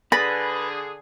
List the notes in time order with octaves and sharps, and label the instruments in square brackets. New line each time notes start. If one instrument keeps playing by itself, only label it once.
[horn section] D3 G#4 [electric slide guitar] B4 [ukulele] B5 [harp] A6 A#6